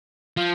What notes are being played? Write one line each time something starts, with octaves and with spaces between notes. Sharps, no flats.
F3